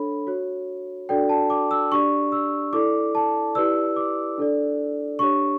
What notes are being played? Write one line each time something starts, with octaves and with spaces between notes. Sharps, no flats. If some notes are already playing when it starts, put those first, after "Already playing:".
Already playing: D4 A4 C#5 B5
F#4 C#5
D4 F#4 A4 D5 G5
A5
D6
E6
D4 G4 D5 C#6
E6
E4 A4 D5 D6
A5
E4 G4 B4 D5 E6
D6
D4 A4 D5
D4 G4 C#5 C#6